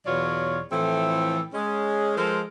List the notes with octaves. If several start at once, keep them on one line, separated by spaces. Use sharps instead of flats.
E2 B2 F#3 F4 C#5 D5
A2 E3 F3 C4 A4 E5
G#3 C#4 G#4
F3 G#3 A4 A#4 C5